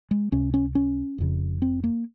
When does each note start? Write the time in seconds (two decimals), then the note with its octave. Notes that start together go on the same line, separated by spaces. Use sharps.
0.11 G#3
0.32 C#2 C3 C#4
0.54 C#4
0.75 C#4
1.18 F1 F2 C#3
1.62 C4
1.84 A#3